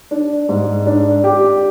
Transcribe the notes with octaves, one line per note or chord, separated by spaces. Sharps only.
D4
G#2
D4
G4